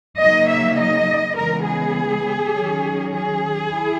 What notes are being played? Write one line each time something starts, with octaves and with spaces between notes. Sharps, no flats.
C#3 F#3 A#3 D#4 D#5
E5
D#5
C#3 E3 G#3 B3 A#4
G#4
D#3 F#3 C#4
G#4
E4